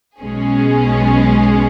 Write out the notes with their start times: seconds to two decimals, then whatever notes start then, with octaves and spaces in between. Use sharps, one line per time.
0.21 B1 B2 G#3 C#4 G#4